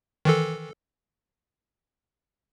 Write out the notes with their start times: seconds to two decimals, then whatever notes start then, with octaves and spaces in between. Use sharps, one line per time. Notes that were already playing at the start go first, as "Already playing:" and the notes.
0.25 D#3 E3 A4